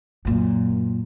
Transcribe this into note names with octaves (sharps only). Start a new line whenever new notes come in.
F#2 A#2